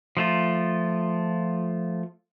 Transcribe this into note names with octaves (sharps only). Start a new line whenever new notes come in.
F3 A3 F4